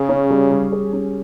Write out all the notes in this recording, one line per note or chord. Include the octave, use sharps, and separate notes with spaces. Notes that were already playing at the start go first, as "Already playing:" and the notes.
Already playing: C#3 G#4
C#4
G3
G3
G#4
C#4